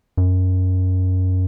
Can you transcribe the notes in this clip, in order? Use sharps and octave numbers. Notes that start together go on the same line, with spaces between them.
F#2